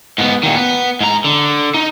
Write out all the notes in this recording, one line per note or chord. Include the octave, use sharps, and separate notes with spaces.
G#2 B3
A#2 D#3
B3
G#2 A#5
D3
D#4